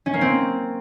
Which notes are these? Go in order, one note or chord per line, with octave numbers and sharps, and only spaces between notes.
C#4
A#3
C4